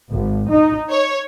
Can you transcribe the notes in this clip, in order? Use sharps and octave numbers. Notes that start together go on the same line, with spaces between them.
G#1
D#4
C#5